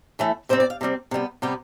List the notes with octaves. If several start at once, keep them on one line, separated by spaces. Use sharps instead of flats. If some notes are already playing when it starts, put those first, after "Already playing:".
A2 E3 A3
C3 G3 C4 C5
D5
F5
C3 G3 C4
C3 G3 B3
C3 G3 B3 G5